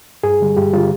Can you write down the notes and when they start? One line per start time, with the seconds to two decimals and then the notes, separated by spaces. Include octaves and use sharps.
0.23 G2 G#4
0.41 D3 G3
0.57 G2 G4
0.73 D3 G3 F4